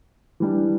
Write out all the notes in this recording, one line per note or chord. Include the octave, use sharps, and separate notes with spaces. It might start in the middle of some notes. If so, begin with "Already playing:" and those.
E3 G3 D4